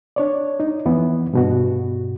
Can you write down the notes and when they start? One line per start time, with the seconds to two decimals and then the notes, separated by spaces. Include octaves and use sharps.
0.16 D4 C#5 D5
0.60 D#4
0.85 F2 E3 B3
1.33 G2 B2 F#4